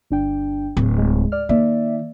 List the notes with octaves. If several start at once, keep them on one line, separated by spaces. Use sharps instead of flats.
G1 D4 G5
D1
G#3
D5 F6
D#3 A#3 D5 E5